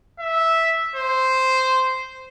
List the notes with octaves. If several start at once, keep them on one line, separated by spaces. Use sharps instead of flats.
E5
C5